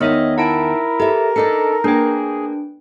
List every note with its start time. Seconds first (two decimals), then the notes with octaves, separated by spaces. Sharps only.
0.01 E2 G#2 D#3 B3 C#5 D#5 E5
0.38 E4 A#4 F#5 A5 D7
1.00 G4 A4 E5
1.36 D4 D#4 A4 D5 C#7
1.84 A#3 D4 G#4 B4 G5